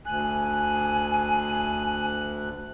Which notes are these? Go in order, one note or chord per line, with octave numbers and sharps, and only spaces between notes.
D2 G#5 F#6